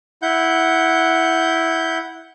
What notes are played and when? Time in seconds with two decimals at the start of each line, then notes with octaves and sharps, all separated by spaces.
0.22 E4 F#5 G6